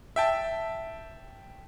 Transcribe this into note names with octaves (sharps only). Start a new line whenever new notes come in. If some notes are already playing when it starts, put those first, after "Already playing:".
E5 G5 A5